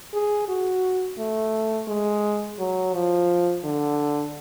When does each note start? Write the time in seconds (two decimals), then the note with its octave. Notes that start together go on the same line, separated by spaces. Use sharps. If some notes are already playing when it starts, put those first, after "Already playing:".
0.13 G#4
0.48 F#4
1.18 A3
1.88 G#3
2.59 F#3
2.94 F3
3.64 D3